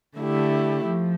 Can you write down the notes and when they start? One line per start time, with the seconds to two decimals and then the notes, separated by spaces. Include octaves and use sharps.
0.17 D3 A3 E4 G4
0.86 F3